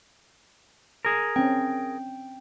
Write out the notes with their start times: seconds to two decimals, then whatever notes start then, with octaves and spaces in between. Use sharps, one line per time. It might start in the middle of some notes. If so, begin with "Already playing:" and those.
1.05 G#4 A#4
1.36 C4 C#4 G5